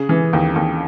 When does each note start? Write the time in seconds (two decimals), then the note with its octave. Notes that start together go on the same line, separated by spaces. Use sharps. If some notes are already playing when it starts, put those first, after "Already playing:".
Already playing: C#3 G#4
0.09 E3
0.33 D#2
0.56 D#2